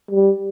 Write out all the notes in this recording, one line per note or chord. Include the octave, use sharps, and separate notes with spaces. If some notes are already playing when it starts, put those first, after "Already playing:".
G3